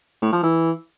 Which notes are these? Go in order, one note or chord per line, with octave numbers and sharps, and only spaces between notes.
A2
F3
E3